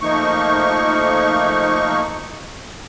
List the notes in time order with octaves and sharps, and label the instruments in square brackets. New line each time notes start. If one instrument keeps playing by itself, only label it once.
[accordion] F3 A3 A#3 D#4 C#6